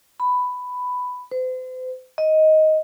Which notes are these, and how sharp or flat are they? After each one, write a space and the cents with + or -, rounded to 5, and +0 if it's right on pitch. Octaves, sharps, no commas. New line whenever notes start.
B5 +10
C5 -40
D#5 +10